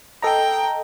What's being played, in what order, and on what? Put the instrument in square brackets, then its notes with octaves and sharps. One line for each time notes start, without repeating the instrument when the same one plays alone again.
[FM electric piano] A4 D#5 A#5 [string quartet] G5